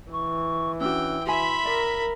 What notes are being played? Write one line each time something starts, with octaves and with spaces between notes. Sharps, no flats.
E3 C#6
C#4 D4 F#4 G5 E6
F#4 E5 G#5 B5 C6
A#4 D5